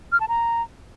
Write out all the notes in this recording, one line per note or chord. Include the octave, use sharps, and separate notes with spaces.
F6
A5
A#5